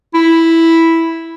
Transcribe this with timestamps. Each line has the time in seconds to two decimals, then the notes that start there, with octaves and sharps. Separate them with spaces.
0.14 E4